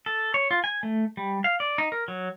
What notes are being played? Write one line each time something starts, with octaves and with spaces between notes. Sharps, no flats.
A4
C#5
F4
G#5
A3
G3
F5
D5
D#4
A#4
F#3